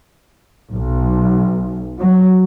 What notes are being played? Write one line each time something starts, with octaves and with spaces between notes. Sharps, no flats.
B1
F#3